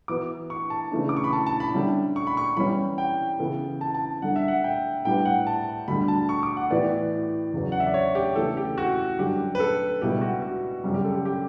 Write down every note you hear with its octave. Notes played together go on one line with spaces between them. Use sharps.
E3 B3 F#4 B4 D6
C#6
A5
C#3 E3 A3 D4
D6
C#6
B5
A5
A5
B5
D3 G3 C#4 E4 G4
C#6
B5
C#6
E3 G3 C#4 G4 B5
G5
C#3 E3 B3 E4 A4
A5
A5
D3 G3 D4 A4 F#5
E5
F#5
G5
A2 G3 D4 G4 B4 G5
F#5
A5
D2 D3 G3 B5
A5
C#6
D6
F#5
A2 E3 B3 E4 G4 D5
E2 C#3 F#3
F#5
E5
D5
C#5
G4
C#3 E3 A3 A4
G4
F#4
F#2 D3 G3 D4 G4
B4
A4
C#2 B2 G3 B3 E4 G4
F#4
F#4
F#2 C#3 G3 G4
G4
A4
G4
G4